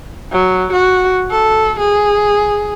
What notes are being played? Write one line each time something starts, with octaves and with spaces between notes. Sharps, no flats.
F#3
F#4
A4
G#4